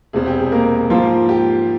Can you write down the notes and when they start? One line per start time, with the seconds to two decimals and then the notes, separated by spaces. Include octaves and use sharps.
0.13 E1 E2 C3 G#4
0.26 G4
0.39 G#4
0.52 A#3 A#4
0.90 G#2 F3 A#3 F4
1.29 G4